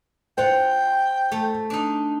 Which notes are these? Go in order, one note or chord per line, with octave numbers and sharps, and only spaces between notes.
F4 C5 F#5 G5
A3
D4 D#4